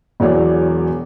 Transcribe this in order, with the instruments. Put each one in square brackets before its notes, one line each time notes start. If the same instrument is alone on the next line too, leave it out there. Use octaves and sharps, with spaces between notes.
[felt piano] E1 E2 F#3 C#5 D5